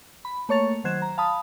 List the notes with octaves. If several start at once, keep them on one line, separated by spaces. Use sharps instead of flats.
B5
A3 A#3 C#5 C#6 A6 F7
D#3 F#3 C5 F#6 G#6 E7
A#5
F5 A5 B5 D#6